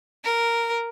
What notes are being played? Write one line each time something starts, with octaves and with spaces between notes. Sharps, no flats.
A#4